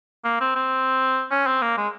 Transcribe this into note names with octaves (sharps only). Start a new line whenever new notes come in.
A#3
C4
C4
C#4
C4
A#3
G#3